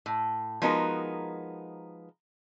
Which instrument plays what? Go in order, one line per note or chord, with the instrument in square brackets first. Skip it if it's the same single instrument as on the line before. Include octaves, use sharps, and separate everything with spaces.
[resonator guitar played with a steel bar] A2
F3 G#3 B3 D#4 F#4 A#4